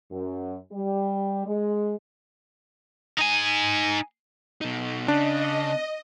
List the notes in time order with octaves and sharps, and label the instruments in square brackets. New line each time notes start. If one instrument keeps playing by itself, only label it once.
[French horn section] F#2
G3
G#3
[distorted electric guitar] D#4 G#5
[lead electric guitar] B2 D#4
[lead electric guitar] C#3 [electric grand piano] D4 [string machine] D#5